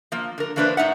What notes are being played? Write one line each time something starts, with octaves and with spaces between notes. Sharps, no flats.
F3 A#3
D3 A#4
E3 F3 A#3 D4 B4 C5
A2 D#4 E5 F#5